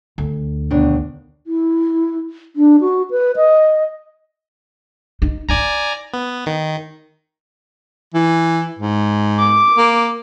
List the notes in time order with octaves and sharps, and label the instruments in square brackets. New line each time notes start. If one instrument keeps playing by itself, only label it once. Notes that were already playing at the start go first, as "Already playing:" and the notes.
[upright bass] D2
[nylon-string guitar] D#2 B2 D4
[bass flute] E4
D4
F#4
B4
D#5
[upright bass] D#4
[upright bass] D#4 E4 [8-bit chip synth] D5 G#5 A#5
[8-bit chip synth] B3
D#3
[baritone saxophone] E3
G#2
[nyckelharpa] D6
[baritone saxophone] A#3